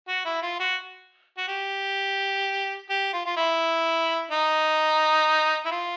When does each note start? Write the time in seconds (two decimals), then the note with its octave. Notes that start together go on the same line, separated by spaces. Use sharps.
0.08 F#4
0.25 E4
0.43 F4
0.60 F#4
1.38 F#4
1.48 G4
2.90 G4
3.14 F4
3.26 F4
3.37 E4
4.31 D#4
5.66 E4
5.71 F4